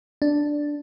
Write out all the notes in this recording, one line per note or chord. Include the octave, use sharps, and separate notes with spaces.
D4